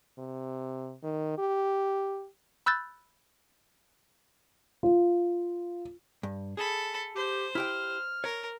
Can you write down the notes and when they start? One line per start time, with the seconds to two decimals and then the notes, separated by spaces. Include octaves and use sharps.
0.18 C3
1.03 D#3
1.38 G4
2.66 B5 E6 F#6 G6 A6
4.83 F4
6.23 G2
6.57 G#4 A4 B5
7.16 G4 C5
7.55 E4 G4 G5 F6
8.24 A#4 C#5